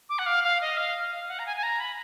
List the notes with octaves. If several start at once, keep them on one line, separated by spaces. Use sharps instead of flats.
D6
F#5
F5
F5
D#5
F5
F5
F#5
A#5
G#5
G#5
A#5
B5